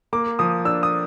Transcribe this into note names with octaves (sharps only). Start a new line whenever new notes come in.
A#3 D6
F3 D#6
D4 E6
D#6